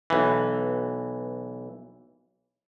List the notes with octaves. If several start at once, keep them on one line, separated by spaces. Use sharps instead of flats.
B1 E3